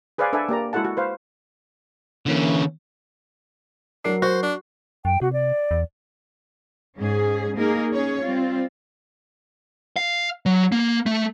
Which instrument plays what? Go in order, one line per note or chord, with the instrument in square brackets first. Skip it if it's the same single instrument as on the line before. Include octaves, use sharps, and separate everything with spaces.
[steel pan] G#4 B4 C5 D5 F5 G#5
D4 A4 B4 D5 E5 G#5
A#3 G4 D5 A#5
G#3 E4 F#4 A4 F#5 A5
F#4
B4 C5 F5
[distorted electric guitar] D3 C#4 [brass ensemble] E3 A#3
[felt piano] F#3 A#4 C7 [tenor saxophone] D4
[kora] F#4 [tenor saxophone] C5
[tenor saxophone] D4
[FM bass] F#2 [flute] G5
[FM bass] C3 [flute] F#4
[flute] D5
[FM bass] E2
[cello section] G#2 C#4 G#4
A#3 D#4 G#4 A#4
C#4 G#4 C#5
G3 C4 F4
[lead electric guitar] F5
F#3
A#3
A3